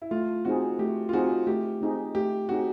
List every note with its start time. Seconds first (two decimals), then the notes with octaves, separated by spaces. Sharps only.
0.02 E4
0.11 A3 F4
0.45 C4 D#4 F#4 G#4
0.79 A3 G4
1.09 F4
1.13 C4 D#4 F#4 G#4
1.47 A3 G4
1.81 C4 D#4 G#4
2.15 A3 G4
2.49 C4 D#4 F#4 G#4